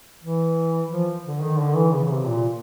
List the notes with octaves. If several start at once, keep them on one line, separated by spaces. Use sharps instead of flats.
E3
F3
D3
D#3
D3
E3
C#3
C3
A#2